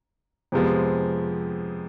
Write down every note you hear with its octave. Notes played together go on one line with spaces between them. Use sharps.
F2 C3 F3 G#3 B3